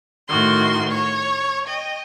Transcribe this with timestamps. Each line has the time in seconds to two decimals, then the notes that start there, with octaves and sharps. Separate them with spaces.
0.27 A2 D#3 F#4 C6
0.89 C#5 C#6
1.67 D#5 G5